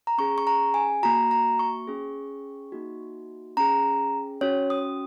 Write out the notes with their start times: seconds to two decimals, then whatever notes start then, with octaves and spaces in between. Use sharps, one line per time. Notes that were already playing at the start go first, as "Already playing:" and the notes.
0.07 A#5
0.18 C#4 G#4 C#6
0.38 C#6
0.47 A#5
0.74 G#5
1.03 A#3 F#4 A#5
1.31 A#5
1.59 C#6
1.88 C#4 G#4
2.72 A#3 D#4 F#4
3.57 C#4 G#4 A#5
4.41 C#4 F#4 C#5
4.70 D#6